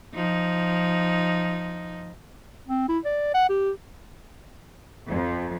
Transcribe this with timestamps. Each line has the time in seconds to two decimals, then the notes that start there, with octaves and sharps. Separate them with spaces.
0.14 F3 D#4
2.68 C4
2.89 E4
3.05 D5
3.34 F#5
3.50 G4
5.10 F2